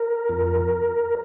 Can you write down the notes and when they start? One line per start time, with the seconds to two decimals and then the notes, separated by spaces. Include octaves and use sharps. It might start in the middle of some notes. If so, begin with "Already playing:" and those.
Already playing: A#4
0.29 F2